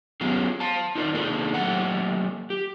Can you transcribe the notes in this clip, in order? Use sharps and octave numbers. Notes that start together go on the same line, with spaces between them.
F#3 B3 C#4 F4 G4 G#4
F5 A5
D#4 F4 A#4 C5 D5
A#3 D4 D#4 G#4 A4
F#3 A3 A#3 G4 A4 F#5
G4